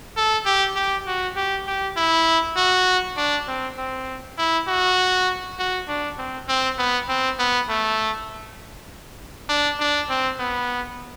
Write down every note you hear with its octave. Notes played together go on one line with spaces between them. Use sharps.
A4
G4
G4
F#4
G4
G4
E4
F#4
D4
C4
C4
E4
F#4
F#4
D4
C4
C4
B3
C4
B3
A3
D4
D4
C4
B3